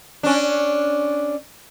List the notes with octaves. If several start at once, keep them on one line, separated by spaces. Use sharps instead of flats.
C#4 D4